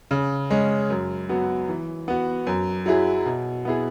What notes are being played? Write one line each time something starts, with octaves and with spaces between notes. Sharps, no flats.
C#3
G#3 C#4
F#2
F#3 B3 F#4
E3
B3 F#4
F#2
F#3 E4 G#4
B2
B3 E4 G#4